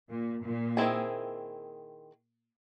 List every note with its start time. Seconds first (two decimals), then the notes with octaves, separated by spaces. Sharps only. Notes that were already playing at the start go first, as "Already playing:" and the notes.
0.09 A#2
0.43 A#2
0.77 D#3 G3 C4 E4 G#4